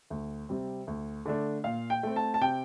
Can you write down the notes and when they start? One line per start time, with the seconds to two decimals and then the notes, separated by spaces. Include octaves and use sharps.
0.10 D2
0.49 C3 G3 C4
0.87 D2
1.26 D3 A3 D4
1.64 A#2 F5
1.90 G5
2.03 A3 C4
2.16 A5
2.34 A5
2.41 C3 G5